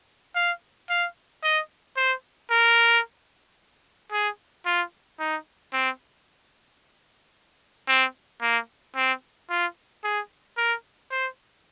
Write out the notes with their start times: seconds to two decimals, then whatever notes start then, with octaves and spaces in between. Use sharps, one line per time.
0.35 F5
0.90 F5
1.43 D#5
1.97 C5
2.51 A#4
4.12 G#4
4.66 F4
5.19 D#4
5.73 C4
7.88 C4
8.42 A#3
8.96 C4
9.49 F4
10.04 G#4
10.57 A#4
11.11 C5